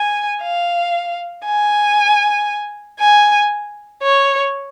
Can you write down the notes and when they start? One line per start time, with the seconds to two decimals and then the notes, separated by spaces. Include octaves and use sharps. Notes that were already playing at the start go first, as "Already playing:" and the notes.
Already playing: G#5
0.43 F5
1.45 G#5
3.00 G#5
4.03 C#5